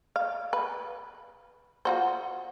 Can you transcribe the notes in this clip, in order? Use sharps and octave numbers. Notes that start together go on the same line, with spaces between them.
F5
B4
F4 F#4 C5